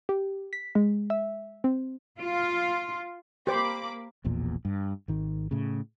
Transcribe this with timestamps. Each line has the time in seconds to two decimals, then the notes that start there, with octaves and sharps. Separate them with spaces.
0.09 G4
0.53 B6
0.75 G#3
1.10 E5
1.64 C4
2.20 F4
3.47 A#3 G4 C5 B5 D6
4.24 E1 A#1 E2 A#2
4.65 G2
5.08 G#1 D#3
5.51 A2 C#3